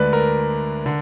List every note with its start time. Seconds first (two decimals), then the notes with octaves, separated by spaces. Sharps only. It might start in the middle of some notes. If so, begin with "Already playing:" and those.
Already playing: D2 D3 G#3 B4 D5
0.13 A#4
0.86 D3